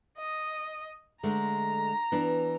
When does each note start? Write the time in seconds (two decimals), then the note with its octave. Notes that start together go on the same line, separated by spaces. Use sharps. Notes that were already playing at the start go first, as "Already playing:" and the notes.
0.18 D#5
1.23 D3 G#3 A3 A#5
2.12 E3 B3 D4